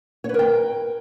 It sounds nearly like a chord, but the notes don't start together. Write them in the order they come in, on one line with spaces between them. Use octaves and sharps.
C#5 B4 A#4 G5